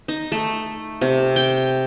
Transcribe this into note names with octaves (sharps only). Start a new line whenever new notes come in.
D#4
A3
C3
G5